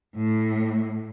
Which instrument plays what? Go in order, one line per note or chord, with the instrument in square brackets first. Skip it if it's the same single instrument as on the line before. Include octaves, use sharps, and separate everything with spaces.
[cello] A2